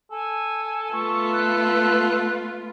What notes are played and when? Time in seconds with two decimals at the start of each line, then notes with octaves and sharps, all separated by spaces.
0.11 A4 G#5
0.93 A3 B3 F4 C#6
1.33 F#6